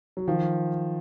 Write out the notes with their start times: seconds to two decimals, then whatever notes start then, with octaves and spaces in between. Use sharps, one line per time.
0.17 F#3
0.27 D#3 F3